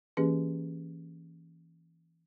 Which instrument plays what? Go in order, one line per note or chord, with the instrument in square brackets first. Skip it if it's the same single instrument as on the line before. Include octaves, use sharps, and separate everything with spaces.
[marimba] E3 A#3 C#4 G4 G#4 B4